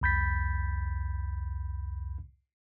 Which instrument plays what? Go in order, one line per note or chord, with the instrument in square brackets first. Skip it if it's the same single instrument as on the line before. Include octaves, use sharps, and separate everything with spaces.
[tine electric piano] C2 F2 B5 G6 A6 B6